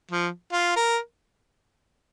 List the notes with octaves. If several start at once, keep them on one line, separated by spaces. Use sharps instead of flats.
F3
F4
A#4